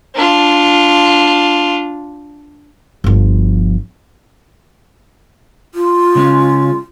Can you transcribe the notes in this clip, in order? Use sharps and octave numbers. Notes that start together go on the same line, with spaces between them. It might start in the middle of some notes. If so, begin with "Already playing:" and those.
D4 F4
G1 F3
F4
C#3 G#3 C#4